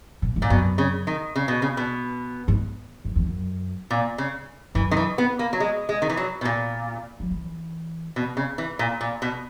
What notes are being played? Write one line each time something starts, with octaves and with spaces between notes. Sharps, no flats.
A#2
G#2
A#2
F#2 B2
C#3
D#3
C#3
B2
C#3
B2
G#2
F#2
E2
F#2
A#2
C#3
F#2 E3
D#3
E3
B3
A#3
F#3
G#3
G#3
D#3
E3
F#3
B2
A#2
F#3
E3
B2
C#3
E3
A#2
A#2
B2